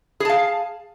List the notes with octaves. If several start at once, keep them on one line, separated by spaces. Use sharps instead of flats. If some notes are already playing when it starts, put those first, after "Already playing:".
G#4 F5 A5